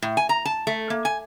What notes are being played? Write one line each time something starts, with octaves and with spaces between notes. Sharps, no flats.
A2
G#5
A#5
A5
A3
A#3
G#5